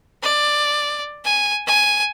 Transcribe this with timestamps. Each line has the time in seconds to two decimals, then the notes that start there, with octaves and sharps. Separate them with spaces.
0.23 D5
1.25 G#5
1.67 G#5